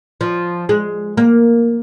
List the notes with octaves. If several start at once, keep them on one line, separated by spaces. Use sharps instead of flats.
F3
G#3
A#3